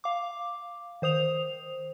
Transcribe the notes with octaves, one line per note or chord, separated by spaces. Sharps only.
F5 D6
D#3 C5 D#6 F7